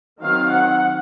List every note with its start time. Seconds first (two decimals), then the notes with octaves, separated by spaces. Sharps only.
0.21 D#3 F#3 C4 F5
0.50 F#5